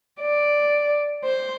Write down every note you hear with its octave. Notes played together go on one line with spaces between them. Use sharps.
D5
C5